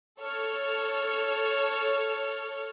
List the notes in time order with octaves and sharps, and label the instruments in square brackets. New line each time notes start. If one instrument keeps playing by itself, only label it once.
[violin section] A4 C#5 F6